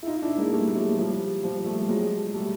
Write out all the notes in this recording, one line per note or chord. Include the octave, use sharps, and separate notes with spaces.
E4
D#4 F4
D4 E4
G#3 A#3
G3 A3
A3
F#3 G#3
F3 G3
F3 G3
G3 A3
G3
F#3 G#3
G3 A3